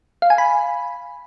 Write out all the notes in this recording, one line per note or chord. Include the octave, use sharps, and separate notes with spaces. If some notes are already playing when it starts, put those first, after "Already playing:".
F5
G#5
B5